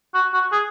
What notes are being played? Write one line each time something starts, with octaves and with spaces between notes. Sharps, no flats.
F#4
F#4
G#4